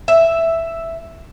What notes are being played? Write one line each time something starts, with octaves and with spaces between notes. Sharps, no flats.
E5